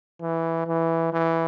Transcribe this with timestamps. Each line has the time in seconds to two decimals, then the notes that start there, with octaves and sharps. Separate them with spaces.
0.22 E3
0.67 E3
1.13 E3